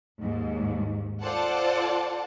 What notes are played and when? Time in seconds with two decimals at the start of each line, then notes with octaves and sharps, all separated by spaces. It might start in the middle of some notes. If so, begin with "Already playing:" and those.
0.20 D#2 G#2
1.22 F4 A4 C5 D5 F#5 A5